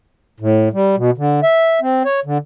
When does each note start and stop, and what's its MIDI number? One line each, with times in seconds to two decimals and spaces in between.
0.40 0.69 45
0.74 0.96 55
0.97 1.11 47
1.18 1.40 50
1.43 1.80 76
1.81 2.03 60
2.05 2.20 73
2.25 2.38 50